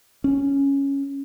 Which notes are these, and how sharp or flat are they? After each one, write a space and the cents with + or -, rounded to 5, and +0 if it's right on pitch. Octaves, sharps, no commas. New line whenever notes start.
C#4 +0